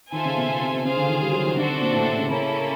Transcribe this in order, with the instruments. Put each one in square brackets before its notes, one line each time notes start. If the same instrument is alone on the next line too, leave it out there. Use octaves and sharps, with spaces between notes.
[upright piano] D#3 [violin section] F4 A4 C5 E5 G#5
[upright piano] C#3
B2
B2
C3
C3
[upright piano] C#3 [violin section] F4 G#4 C5 F5
[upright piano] D3
D#3
G3
F#3
D#3
[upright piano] D3 [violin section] D4 F#4 A4 C5
[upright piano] C3
A#2
A2
A2
C#3
[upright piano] C#3 [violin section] A#3 C#4 E4 A4